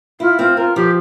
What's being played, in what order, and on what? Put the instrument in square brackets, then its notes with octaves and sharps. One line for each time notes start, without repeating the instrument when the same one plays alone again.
[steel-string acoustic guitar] E4 [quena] F4
[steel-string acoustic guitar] C4 [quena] F4
[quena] F4 [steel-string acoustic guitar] A#4
[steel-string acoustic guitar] F3 [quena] G4